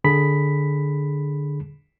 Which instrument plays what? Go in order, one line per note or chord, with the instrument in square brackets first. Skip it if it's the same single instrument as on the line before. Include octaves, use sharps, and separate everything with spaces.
[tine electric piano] D3 G#4 B5 B6